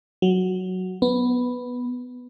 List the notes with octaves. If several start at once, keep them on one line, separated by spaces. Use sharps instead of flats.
F#3
B3